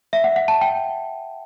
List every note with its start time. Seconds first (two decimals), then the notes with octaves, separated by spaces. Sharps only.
0.13 E5
0.24 F#5
0.36 F#5
0.48 A5
0.61 G5